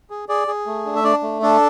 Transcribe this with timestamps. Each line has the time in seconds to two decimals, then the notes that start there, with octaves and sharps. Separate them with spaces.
0.10 G#4
0.29 G#4 D5
0.48 G#4
0.66 A3
0.86 D4
0.96 E5
1.04 D4 D5
1.23 A3
1.42 D4 A4